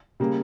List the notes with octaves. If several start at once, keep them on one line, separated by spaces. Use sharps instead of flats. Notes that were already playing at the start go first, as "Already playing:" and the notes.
C#3 G3 A#3